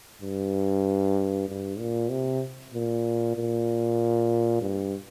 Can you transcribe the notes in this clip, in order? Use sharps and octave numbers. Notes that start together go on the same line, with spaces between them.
G2
G2
A#2
C3
A#2
A#2
G2